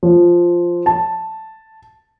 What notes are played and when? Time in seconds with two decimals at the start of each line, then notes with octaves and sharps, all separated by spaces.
0.03 F3
0.86 A5